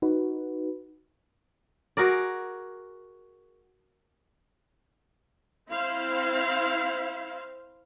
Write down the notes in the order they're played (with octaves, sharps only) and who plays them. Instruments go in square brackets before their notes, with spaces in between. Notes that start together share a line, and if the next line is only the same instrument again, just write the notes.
[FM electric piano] D#4 F#4 B4
[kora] F#4 G#4 A#4 D5
[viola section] C4 E4 C5 F5